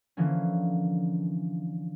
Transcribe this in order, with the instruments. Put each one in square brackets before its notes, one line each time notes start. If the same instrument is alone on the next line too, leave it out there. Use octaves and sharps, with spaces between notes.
[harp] D3 E3 F3 A#3 C#4